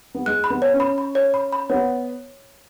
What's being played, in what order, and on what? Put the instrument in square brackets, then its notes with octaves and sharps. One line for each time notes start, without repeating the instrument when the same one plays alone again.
[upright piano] B3
[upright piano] G#3 [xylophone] F#6
[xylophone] B5
[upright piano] B3
[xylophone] C#5
[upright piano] C#4
[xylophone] B5
B5
C#5
B5
B5
[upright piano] B3 [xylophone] C#5